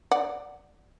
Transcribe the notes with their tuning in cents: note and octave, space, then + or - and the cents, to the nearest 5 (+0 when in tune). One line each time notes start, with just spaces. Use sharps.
D5 +0 F#5 +0